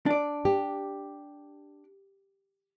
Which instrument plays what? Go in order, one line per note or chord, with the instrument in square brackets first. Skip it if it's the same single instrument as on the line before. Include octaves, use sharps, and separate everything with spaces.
[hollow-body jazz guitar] D4 D5
[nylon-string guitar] G4